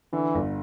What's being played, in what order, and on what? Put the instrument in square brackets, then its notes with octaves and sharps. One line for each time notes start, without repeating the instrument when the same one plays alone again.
[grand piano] D3 [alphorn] E3
[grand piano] G1